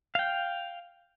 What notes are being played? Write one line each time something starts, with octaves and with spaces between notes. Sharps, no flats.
F5 G5